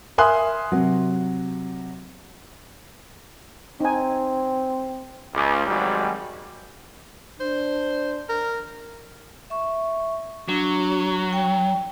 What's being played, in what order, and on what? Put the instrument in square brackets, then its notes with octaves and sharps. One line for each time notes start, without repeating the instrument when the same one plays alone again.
[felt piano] A#4 E5 G#5 C6 D#6 F#6
C3 F#3
[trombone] C4 [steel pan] D#4 G#5
[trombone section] C#2
G#1 G#2 F#3 G3
[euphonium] D4 [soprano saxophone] C5
[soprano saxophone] A#4
[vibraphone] E5 C#6
[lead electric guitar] F#3 [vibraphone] D4
[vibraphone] G5